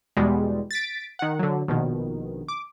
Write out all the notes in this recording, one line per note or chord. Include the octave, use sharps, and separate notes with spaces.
E2 B2 G3 G#3
A6 B6 D7
D#3 F#5
D3 F#3
A#1 B2 D#3
D6